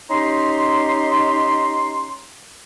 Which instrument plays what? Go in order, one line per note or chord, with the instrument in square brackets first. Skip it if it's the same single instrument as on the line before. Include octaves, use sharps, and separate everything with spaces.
[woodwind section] C#4 D#4 G4 A#5 C6